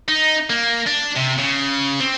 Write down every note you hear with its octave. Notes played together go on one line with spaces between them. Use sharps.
D#4
A#3
D4
C3
C#3
C4